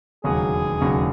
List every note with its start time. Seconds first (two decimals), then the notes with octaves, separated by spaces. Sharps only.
0.24 E1 D#2 C#3 F#3 C#4 G#4
0.81 E1 D#2 C#3 F#3 C#4